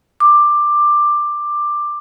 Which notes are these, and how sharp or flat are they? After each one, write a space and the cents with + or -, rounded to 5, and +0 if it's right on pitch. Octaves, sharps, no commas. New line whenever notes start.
D6 +15